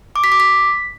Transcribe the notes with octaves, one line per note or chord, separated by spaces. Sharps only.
D6
B6
D6
B6